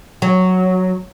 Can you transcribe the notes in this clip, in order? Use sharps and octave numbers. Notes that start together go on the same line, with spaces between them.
F#3